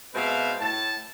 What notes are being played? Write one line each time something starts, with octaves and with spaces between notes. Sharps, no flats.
B2 G#3 C4 B4 E5 F5
A2 A5